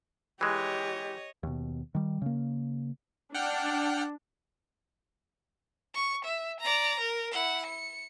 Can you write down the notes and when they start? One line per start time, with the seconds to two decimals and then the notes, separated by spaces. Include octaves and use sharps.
0.41 E3 G#3 G4 C#5 D#5
1.43 D#2 B2
1.95 D#3 G3
2.22 C#3 A#3
3.35 D4 F#5 G5 F6
5.94 C#6
6.25 E5
6.61 D5 A#5
7.00 A#4
7.32 E4 F#5
7.66 C#7